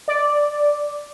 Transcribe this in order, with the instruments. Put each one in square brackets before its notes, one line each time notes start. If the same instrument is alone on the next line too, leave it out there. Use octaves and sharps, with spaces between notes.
[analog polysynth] D5